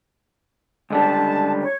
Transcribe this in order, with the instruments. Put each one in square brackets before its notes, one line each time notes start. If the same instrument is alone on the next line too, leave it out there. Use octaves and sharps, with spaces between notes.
[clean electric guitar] C#2 D3 G3 [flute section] A5
[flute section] C#5